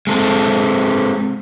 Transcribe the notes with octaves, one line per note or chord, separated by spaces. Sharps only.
G#3 C4 A4